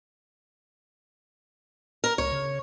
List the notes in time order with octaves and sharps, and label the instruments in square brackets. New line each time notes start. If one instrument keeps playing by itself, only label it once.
[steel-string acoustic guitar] A#4
[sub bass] C#2 [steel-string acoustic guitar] C#5
[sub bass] C#3